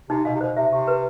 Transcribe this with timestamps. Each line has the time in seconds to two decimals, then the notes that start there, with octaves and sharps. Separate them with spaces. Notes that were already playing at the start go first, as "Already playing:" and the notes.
0.09 C3 D#4
0.25 B2 F5
0.34 C3
0.40 B2 C5
0.56 C3 E5
0.72 C3 G4
0.88 B4